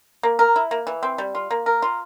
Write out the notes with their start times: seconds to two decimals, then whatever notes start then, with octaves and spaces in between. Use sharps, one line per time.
0.23 A#3
0.39 A#4
0.56 E4
0.71 A#3
0.87 E3
1.03 C4
1.18 G3
1.35 F4
1.51 A#3
1.66 A#4
1.82 F4